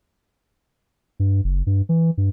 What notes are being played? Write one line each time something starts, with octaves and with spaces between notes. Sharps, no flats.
G2
F#1
G2
E3
G2